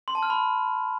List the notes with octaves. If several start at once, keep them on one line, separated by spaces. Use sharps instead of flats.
C6
A5
F6
B5